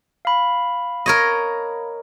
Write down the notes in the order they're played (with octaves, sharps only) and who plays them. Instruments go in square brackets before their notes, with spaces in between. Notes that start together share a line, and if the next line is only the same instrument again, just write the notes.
[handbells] F5 B5
[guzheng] A#4 C#5 D#5